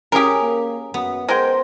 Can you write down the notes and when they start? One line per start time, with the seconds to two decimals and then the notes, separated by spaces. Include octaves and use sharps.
0.12 C#4 G4 G#4 A#4
0.42 A#3
0.94 F#2 B3
1.29 G#3 A#4 C5 G5